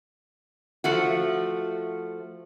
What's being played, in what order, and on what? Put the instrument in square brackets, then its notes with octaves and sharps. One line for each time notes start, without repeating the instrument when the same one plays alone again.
[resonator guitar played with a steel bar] F3 A3 F#4